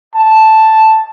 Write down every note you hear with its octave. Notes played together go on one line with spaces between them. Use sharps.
A5